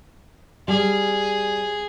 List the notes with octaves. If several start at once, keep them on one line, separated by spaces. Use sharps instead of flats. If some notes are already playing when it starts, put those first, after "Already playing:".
G3 G#4